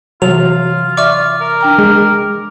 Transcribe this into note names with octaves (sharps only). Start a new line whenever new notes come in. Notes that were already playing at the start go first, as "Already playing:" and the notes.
C3 E3 F#3 F4 F7
F4 D5 E5 C#6 D6 F6
A#4
D4 G5 A#5
G#3